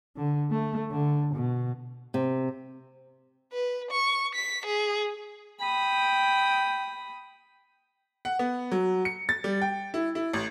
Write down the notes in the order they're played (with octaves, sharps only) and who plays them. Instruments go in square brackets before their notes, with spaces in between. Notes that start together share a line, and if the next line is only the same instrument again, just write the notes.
[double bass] D3
A3
D3
B2
[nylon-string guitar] C3
[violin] B4
C#6
B6
G#4
[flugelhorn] G5 [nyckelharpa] B5 D#6
[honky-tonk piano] F#5
B3
F#3
C#7
A6
G3
G5
E4
E4
A1